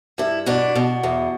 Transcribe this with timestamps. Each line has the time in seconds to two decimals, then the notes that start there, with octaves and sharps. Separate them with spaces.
0.18 G2 E4
0.46 B2 D4
0.75 B2
1.03 E2